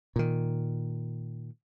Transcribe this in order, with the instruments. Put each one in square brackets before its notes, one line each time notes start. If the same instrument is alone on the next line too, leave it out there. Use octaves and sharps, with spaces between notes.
[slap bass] A#2 D#3